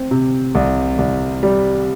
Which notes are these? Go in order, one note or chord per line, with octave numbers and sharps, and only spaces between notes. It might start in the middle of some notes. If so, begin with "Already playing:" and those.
Already playing: C4
C3
C2
C2
G3